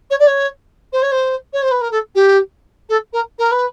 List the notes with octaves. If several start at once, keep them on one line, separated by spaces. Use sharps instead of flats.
C#5
D5
C#5
C5
C#5
C5
C#5
C5
B4
A#4
A4
G4
A4
A#4
A#4
B4